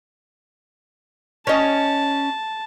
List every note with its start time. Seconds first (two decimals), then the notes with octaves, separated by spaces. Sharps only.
1.47 C#4 D#5 A5